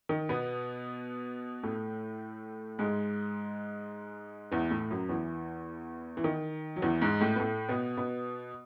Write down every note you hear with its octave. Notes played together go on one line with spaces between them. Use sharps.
D#3
B2 B3
A2 A3
G#2 G#3
E2 E3
A2 A3
F#2 F#3
E2 E3
E3
D#3
F#3
E2 E3
G#2 G#3
A2 A3
B3
A2 A3
B2 B3
B2 B3